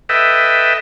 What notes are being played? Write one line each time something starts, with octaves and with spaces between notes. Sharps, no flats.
A4 B4 D#5 E5 G5